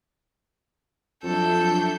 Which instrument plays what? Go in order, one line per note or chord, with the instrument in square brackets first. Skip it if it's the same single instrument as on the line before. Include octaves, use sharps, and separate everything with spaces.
[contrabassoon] F2 [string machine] F#3 D4 E5 [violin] A4 G6